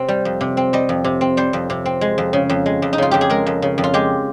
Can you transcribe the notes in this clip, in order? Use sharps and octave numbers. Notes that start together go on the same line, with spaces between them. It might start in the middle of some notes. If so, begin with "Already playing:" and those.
Already playing: C3 C4
G3
F2
C3
C4
G3 D#5
F2
C3
C4
G3 C5
F2
C3
C4
G#3
F2
C#3
F2
G#3
F2
D#4
C#3 F4
F2 G4
G#4
G#3 A#4
F2
C#3
F2
F4
G#3 G4